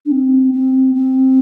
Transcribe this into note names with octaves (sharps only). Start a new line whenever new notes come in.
D4
C4
C4
C4